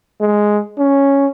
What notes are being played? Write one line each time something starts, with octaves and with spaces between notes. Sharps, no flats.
G#3
C#4